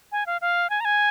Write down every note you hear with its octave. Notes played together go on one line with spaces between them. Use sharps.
G#5
F5
F5
G#5
A#5
G#5